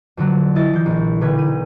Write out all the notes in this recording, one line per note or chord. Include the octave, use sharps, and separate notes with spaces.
F2 D3 F#3
E4 D#5 A6
E3 G6
A#1
B1 D3 B4 G#6
D#7